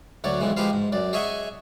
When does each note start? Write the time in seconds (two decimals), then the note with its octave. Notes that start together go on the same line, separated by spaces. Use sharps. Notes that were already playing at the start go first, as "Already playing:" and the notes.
0.24 D2 F#3 C#5 D5
0.40 B1 F2 E3 G#3
0.57 F3 G#3 G4 B4 C5 F5
0.73 G#2
0.92 F#2 D5
1.13 G#4 C#5 D#5 E5 F#5 G#5